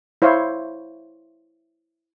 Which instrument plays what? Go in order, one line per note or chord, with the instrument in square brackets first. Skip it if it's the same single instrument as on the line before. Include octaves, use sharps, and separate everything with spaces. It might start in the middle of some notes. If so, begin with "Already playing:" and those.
[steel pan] E4 C5 C#5 F5